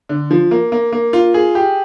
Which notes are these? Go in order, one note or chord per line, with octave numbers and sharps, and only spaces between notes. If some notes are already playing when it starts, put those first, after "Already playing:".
D3
F3
A#3
A#3
A#3
F4
G#4
G4